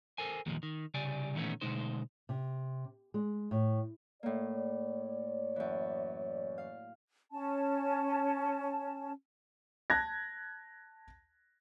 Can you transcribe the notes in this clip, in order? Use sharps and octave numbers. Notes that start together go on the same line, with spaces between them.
A4 A#4 C5 G#5
E2 A#2 D#3 F3
D#3
C2 C#3 G3 D5 G#5
A#2 D#3 E3 A3 B3 C#4
D2 G#2 B2 G#3 D#4 C5
C3
G#3
A2
A2 A#3 C#5 D5
F#2 E3
F5
C#4 A5
A5 F#6 G#6 A#6